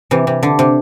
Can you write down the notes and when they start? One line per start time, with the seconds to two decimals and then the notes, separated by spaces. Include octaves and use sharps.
0.11 C3 E3
0.27 C3
0.43 D3
0.59 C3